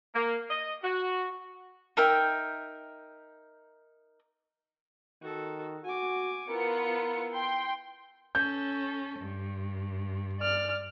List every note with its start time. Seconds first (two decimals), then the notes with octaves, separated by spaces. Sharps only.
0.15 A#3
0.50 D#5
0.83 F#4
1.97 D#4 A#4 E5 G5
5.22 D#3 F#4 A4
5.85 F#4 G#5 D6
6.50 B3 E4 F4 A#4 C#7
7.33 G5 C6
8.35 C#4 A4 G6
9.20 G2
10.39 D5 F6